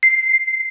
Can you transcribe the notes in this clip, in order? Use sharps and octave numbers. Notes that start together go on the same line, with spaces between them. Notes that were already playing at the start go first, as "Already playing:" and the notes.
C7